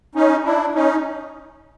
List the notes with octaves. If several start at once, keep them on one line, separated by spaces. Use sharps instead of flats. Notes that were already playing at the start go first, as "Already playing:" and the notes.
C#4 D#4
D4 E4
C#4 D#4